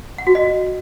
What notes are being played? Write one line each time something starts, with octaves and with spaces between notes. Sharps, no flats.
F#5
F#4
D#5